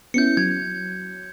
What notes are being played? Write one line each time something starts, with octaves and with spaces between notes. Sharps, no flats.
B3 C#4 E4 G6 C#7
F#3 G#6